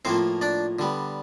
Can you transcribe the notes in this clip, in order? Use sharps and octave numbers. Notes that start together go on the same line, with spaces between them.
A2 F3 A#3 C4 C5
D4 D5
D3 G3 B3